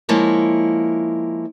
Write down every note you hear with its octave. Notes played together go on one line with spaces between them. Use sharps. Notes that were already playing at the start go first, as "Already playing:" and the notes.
F3 G#3 A#3 E4 C#5